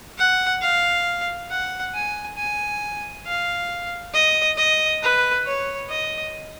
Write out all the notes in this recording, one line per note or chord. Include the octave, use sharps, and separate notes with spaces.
F#5
F5
F#5
G#5
G#5
F5
D#5
D#5
B4
C#5
D#5